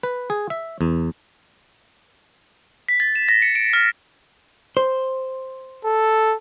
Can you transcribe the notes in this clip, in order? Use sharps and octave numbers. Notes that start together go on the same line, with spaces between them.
B4
G#4
E5
E2
B6
A6
E7
A#6
C#7
D7
F6
C5
A4